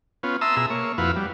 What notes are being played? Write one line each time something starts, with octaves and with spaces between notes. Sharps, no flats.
B3 C#4 F4
E5 A5 A#5 C6 D#6 E6
B2 G#4 E5 A#5 E6
A#3 C#5
F2 E4 F#4 B4 F5
G3